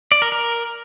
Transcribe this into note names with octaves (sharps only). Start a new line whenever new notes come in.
D5
A#4
A#4